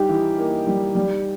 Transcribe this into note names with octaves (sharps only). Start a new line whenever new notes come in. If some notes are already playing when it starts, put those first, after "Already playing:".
Already playing: G3 D#4 G4
E3
A#3
G3
G3